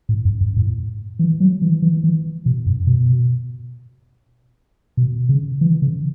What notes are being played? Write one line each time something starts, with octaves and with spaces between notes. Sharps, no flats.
A2
F#2
F#2
A2
E3
F#3
E3
E3
E3
B2
F#2
B2
B2
C#3
E3
C#3